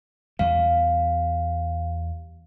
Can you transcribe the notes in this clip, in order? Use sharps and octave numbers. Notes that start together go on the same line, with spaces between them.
E2 G3 F5